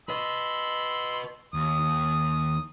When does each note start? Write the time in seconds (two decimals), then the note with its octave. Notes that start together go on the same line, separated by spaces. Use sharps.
0.09 B4 D#5 B5 C6 E6
1.54 D#2 D#6